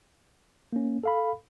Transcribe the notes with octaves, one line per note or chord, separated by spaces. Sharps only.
A#3 C#4
A4 F5 B5